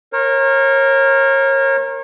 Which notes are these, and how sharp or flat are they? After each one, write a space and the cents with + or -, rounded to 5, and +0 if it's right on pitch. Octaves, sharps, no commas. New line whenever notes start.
A#4 +0 C#5 -35